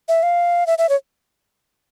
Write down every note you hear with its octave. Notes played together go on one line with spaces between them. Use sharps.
E5
F5
E5
E5
C#5